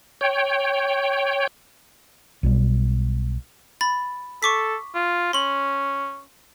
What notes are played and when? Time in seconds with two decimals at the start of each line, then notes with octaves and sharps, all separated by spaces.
0.21 C#5 G5
2.43 B1 B2 G3
3.81 B5 A6
4.43 A4 C#6 D6 B6
4.95 F4
5.33 C#4 C6 F#7